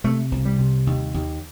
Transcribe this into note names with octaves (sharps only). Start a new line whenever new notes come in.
C3 A3
C2
G3
C3
D#2
D#2